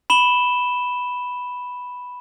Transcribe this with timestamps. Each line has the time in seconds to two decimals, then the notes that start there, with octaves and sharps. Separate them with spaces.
0.10 B5 E7 G7